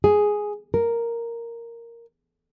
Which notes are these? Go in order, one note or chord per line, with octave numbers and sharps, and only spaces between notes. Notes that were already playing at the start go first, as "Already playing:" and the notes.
G#4
A#4